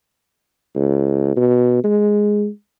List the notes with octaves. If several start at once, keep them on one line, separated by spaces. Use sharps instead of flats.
C#2
B2
G#3